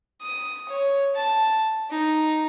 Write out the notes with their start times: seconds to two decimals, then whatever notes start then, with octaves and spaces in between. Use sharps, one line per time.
0.22 D#6
0.69 C#5
1.16 A5
1.90 D#4